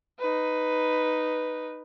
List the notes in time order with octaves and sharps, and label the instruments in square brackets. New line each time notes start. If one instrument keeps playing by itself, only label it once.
[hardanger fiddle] D#4 B4